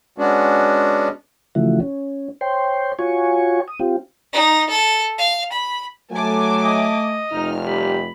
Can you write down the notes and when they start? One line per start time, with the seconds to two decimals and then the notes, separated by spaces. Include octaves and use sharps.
0.18 G#3 B3 C#4 D4 F#4
1.55 C#3 E3 F3 A3 E4 F#4
1.80 C#4
2.41 C5 C#5 G5 C6
2.99 F4 F#4 C#5 G#5 C#6
3.68 D#6
3.80 C4 F4 G4
4.33 D#4
4.70 A4
5.18 F5
5.53 B5
6.12 F#3 A3 G#5 A5 D6
6.59 D#5
7.31 F1 D#4 F6
7.64 G3 D#4 G4 B5